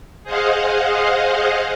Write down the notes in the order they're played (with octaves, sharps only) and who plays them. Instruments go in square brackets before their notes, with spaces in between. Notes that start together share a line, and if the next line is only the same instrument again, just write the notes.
[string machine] G#4 C5 D#5 F5 F#5